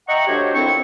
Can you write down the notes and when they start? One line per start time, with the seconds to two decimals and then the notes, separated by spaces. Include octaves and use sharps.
0.09 D#5 E5 F#5 G5 A#5 C#6
0.27 F#3 A3 D4 G4 C5 C#5
0.54 C2 F2 C4 E4 C#6